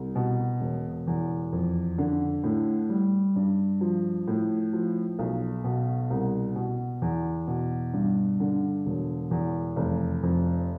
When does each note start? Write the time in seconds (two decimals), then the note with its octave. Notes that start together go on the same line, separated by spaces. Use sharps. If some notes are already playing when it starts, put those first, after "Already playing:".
Already playing: C2
0.15 B2
0.60 E1
1.07 E2
1.52 F2
1.98 D3
2.44 A2
2.89 G3
3.36 G2
3.81 F3
4.28 A2
4.73 F3
5.19 B1
5.64 B2
6.10 C2
6.56 B2
7.02 E2
7.48 B2
7.93 G2
8.40 D3
8.86 E1
9.31 E2
9.76 F1
10.23 F2